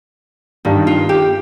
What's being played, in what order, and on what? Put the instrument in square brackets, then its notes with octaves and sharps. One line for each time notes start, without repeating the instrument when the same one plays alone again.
[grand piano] G2 D#3 G3 [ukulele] D#4
[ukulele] F4
G4